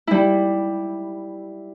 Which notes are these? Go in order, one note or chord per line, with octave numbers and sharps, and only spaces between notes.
G3 E4